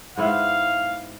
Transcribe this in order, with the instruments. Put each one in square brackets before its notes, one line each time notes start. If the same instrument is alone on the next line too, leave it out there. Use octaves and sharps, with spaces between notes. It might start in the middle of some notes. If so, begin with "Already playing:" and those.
[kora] G#2 B3 E4 [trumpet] F5